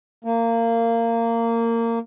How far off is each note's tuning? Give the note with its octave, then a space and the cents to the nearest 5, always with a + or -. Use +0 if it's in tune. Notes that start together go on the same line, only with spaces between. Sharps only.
A#3 -20